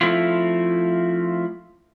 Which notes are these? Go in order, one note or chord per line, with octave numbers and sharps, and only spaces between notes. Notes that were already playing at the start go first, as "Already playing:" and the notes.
F3 A3 C4 E4 F4